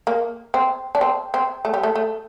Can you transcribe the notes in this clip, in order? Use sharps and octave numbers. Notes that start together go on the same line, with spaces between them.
A#3
C4
D4
C4
C4
A3
G3
A3
A3